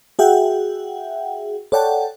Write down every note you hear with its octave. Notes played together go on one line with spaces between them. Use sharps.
F#4 G#4 E5 F#5 G5
A4 C#5 D5 F#5 G5 A5